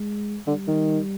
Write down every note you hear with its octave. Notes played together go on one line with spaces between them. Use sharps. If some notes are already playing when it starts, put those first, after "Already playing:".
Already playing: G#3
D3 G3
D#3